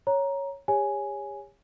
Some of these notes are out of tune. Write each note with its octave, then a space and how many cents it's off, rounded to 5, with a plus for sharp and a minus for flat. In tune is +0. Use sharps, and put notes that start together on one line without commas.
C#5 +0 A#5 +10
G4 +45 C#5 +5 G#5 +5